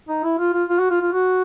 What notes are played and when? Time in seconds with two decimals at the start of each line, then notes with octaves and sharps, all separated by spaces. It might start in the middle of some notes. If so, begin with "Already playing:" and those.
0.08 D#4
0.24 E4
0.38 F4
0.53 F4
0.69 F4
0.79 F#4
0.90 F4
1.01 F4
1.12 F#4